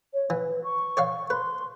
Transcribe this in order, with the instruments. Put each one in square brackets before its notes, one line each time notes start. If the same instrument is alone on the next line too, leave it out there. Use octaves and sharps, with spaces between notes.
[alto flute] C#5
[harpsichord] E3 [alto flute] B4
[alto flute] C#6
[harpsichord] C#5 D5 F5
[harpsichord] B4 [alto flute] C6